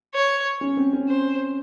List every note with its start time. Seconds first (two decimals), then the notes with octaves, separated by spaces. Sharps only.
0.14 C#5
0.61 C#4
0.77 C4
0.93 C#4
1.08 C5